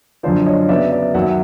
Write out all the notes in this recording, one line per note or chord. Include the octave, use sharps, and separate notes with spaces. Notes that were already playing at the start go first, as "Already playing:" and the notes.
F#2 D3 F3 C5 D5
C#5 D#5
C#3 F#3 B3 D5 E5
D5 E5
F#2 D#3 F#3 E5 F#5